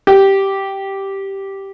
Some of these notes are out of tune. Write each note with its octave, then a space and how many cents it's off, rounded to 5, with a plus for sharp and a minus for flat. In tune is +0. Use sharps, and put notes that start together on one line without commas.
G4 -5